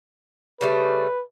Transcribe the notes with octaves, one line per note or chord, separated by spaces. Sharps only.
C#3 G3 A3 B4